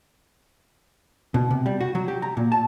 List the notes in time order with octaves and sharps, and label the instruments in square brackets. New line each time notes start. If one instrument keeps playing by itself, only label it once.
[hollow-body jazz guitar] B2
C3
G3
F#4
F#3
G4
A#5
A#2
A5